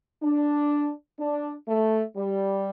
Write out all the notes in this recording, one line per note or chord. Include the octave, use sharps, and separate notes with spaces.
D4
D4
A3
G3